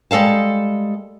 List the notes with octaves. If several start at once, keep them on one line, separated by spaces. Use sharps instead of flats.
G3 G#3 A4 F5 A5